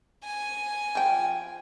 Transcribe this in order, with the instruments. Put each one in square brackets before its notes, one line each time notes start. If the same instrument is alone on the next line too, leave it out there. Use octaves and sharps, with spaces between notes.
[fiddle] G#5
[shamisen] F3 G5